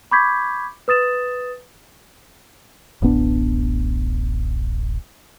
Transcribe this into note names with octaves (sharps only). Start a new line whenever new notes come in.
B5 C#6 D6 G6 G#6 B6
B4 D#6 A6 E7
D1 A1 B3 D4